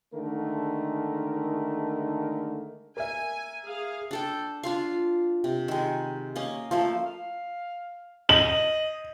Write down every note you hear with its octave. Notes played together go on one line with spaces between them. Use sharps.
D3 D#3 G#3 A3 A#4
A#4 E5 G#5
G#4 F5
D4 A4 G5
D4 F4 F5
C3
D#3 G#3
A#3 C#4 D#5
F3 A3 A#3
F5
D#5 F#7